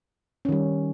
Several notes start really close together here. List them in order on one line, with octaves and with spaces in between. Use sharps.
C#4 D#3 G3